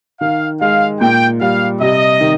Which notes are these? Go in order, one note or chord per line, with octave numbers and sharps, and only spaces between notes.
D#3 F5
G#3 F5
A#2 G5
G3 F5
C3 D#5
D#3